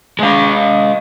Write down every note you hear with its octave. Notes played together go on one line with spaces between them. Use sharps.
G#3 F5